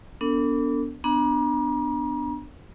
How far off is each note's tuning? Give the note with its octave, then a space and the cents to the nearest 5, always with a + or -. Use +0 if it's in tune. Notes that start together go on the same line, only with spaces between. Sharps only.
B3 +0 D4 -20 A4 +45
B3 +25 D4 +15 A#5 +40